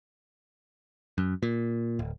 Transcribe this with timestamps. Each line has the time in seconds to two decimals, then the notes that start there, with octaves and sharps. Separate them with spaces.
1.18 F#2
1.43 A#2
1.99 D1